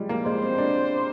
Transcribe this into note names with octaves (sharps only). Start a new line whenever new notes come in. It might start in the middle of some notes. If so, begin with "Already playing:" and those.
Already playing: F3 G3 G#3
A#3
G#3 C5
C4
D4